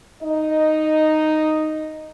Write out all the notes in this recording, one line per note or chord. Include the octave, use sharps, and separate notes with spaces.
D#4 D#5